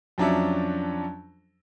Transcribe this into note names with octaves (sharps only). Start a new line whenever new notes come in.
F2 F3 F#3 C#4 D4 E5